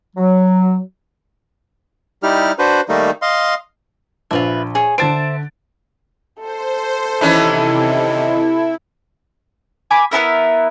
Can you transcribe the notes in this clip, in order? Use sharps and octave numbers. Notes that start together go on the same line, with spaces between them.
F#3
G3 D#4 E4 G4 F6
D4 F#4 B4 C5
D#3 G3 A3 A#3 D#4
D#5 F5 C6
A#1 F4 B4 E5
G#4 C#5
D3 C5 E5 A5 A6 D7
A4 C5
C3 D#3 E3 C#4 E4
G#5 B5 D6
B3 C4 E4 A#4